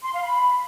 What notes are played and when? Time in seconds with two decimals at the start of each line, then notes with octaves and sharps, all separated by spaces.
0.03 C6
0.13 F5
0.24 B5